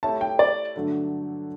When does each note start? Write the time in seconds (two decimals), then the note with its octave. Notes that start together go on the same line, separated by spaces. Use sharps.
0.03 A3 E4 G4 C#5 E5 A5
0.21 G5
0.39 D5
0.75 G2 D3 F#3 A3 D4